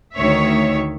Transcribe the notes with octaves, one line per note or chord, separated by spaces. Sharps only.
D2 D#3 C#5 E5